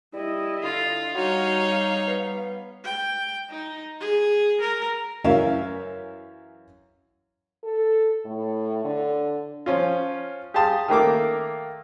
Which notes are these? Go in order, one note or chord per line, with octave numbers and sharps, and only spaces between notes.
G3 E4 D#5
D3 F4
G3 D#4 F#4 C#5 F5
B3
G5
D#4
G#4
A#4
F#2 E3 C#4 A#4 E5 F5
A4
A2
D3
F3 C#4 F4
G4 G#4 F5 A5 C6 D#6
D#3 A3 A#3 D6